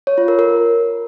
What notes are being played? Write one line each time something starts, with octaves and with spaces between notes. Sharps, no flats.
C#5
F4
A#4
A#4